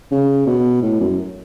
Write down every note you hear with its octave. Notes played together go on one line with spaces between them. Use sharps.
C#3
B2
A2
F#2